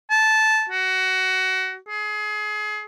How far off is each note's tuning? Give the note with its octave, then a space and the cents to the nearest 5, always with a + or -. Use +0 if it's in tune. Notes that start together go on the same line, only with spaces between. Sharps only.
A5 -10
F#4 +20
G#4 +30